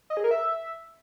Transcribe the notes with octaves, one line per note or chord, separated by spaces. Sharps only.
D#5
G#4
A#4
E5